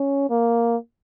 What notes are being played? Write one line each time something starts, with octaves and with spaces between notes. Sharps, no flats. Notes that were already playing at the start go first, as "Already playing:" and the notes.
Already playing: C#4
A#3